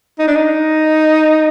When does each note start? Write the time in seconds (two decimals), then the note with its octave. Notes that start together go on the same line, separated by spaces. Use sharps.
0.19 D#4
0.27 D4
0.35 D#4